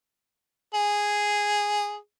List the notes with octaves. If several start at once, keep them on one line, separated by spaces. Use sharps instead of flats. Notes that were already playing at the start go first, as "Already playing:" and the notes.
G#4